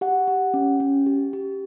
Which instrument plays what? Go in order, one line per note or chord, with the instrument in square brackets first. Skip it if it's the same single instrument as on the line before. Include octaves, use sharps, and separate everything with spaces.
[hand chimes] G4 F#5
G4
C#4
C#4
G4
G4